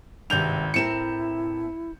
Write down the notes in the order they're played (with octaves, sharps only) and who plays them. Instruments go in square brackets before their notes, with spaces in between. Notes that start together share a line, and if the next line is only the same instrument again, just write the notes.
[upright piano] G#1 G6 F7 [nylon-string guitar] G2 C3
[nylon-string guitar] A2 C4 A#4 [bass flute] E4 [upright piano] C#7 E7